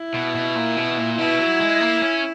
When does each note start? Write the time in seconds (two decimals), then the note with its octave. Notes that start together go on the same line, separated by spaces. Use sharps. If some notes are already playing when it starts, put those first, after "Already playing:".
Already playing: E4
0.14 B2
0.36 B2
0.56 A#2
0.77 B2
0.98 A#2
1.18 B2 E4
1.39 F#3
1.60 G#3
1.81 A#3
2.01 C#4